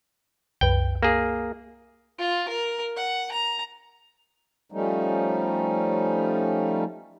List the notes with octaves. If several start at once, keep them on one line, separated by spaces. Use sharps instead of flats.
C2 F#2 B4 G5
A#3 G#4
F4
A#4
F#5
A#5
F3 G3 A3 C#4 D#4